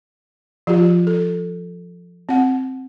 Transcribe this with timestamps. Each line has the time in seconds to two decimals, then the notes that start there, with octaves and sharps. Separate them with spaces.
0.67 F3 F4 G4
1.07 A4
2.29 C4 F#5